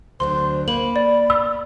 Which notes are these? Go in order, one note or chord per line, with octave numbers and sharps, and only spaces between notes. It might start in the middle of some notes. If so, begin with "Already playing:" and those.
D2 F#3 D4 C5 C6
A#3 B5 F#7
D5
E6